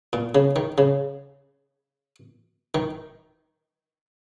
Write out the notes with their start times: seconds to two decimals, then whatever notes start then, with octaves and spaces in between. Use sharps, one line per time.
0.13 A#2
0.35 C#3
0.56 D#3
0.78 C#3
2.75 D#3